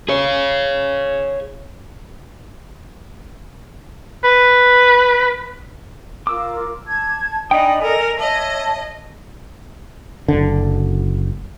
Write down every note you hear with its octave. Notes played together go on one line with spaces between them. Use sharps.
G#4 C#5
B4
F4 A#4 D6 E6
A5 G#6
D4 D#4 D5 D#5 G5 G#5 B5 D#6
A4 A#4 G#5
C#5 D#5 E5 A5
F#1 D3